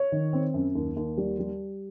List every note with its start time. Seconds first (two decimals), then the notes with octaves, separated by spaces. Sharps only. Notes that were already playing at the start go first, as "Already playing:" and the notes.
Already playing: C#5
0.12 D#3
0.33 C4
0.54 F#2
0.75 D#2
0.96 D#2
1.17 G3
1.39 G3